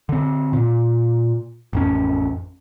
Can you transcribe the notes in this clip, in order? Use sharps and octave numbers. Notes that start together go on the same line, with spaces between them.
D3 C4
A#2
A1 F2 C#4